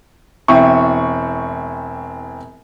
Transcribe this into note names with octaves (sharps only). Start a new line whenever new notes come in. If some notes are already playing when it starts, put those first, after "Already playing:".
E1 C4 E4 C#6